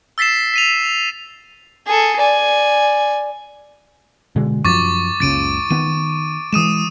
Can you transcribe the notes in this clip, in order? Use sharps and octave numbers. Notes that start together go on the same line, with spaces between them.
E6 A6 B6 C7 E7
B6 D#7 F7
G#4 A4
D5 G#5
B2 D3 G#3
F#2 F3 C#6 D6 A6
F#1 C#2 C#3 A6 D7 D#7
D#3 B3 D#7
E3 G#3 D#6 D#7 E7